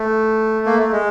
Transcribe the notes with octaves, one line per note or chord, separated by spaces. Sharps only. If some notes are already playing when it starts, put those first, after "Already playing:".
Already playing: A3
A#3
A3
G#3